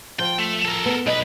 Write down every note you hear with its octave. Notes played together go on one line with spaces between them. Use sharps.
F3 G5
A3
A4 A#4
B3
B1 B4 D#5